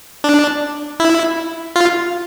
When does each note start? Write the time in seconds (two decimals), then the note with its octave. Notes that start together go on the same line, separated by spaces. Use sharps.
0.24 D4
1.00 E4
1.76 F4